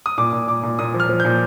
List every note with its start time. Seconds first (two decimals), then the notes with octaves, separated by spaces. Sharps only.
0.06 D#6
0.18 A#2 D6
0.33 A#2
0.48 A#2 D6
0.63 A#2
0.79 A#2 D#6
0.94 F3
1.00 F6
1.09 F3
1.20 A#2 G6